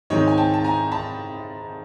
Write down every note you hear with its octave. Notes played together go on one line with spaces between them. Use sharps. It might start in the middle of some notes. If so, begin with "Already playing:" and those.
G#2 D#3 G#3 C4 D#4 C#5 D#5
G#5
G5 A5
A5
G#5 A#5
A5 B5